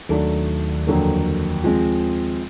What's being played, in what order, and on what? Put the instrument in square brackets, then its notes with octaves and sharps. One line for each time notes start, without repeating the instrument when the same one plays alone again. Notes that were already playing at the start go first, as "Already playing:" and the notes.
[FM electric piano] D#2 D#3 [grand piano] F#3 A3 D4
[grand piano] F2 D3 F#3 A#3
F3 G#3 C4